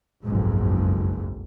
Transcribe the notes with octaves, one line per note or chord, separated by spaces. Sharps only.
F#1 B1 F2 G#2